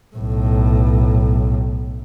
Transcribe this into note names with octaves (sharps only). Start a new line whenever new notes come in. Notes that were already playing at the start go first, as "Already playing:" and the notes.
B1 A2